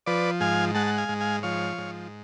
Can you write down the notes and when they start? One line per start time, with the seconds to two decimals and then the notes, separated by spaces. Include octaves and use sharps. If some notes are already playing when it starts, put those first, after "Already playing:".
0.06 F3 B4 D5
0.40 G#2 F5 G#5
0.75 G#3 F#5 A5
0.87 F#5
0.98 F5 G#5
1.09 G#2
1.20 F5 G#5
1.43 F3 C#5 F5
1.78 G#2